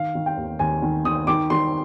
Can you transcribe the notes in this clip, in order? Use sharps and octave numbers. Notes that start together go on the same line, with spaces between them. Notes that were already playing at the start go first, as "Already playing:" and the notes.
Already playing: D#3 F5
D#3
G5
D#2
D#2 G#5
D#3
D#3 D#6
D#3 D6
D#3 C6